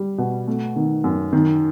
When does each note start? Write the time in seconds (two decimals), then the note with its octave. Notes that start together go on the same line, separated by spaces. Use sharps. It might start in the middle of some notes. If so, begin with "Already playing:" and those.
Already playing: G3
0.18 B2
0.47 A3
0.76 D#3
1.04 F#2
1.33 D#3